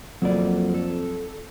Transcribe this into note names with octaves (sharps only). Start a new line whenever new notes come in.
F2 F#3 A#3 D5
A4